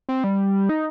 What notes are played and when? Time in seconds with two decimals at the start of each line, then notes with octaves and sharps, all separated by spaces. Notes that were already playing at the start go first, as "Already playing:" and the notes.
0.09 C4
0.24 G3
0.69 D#4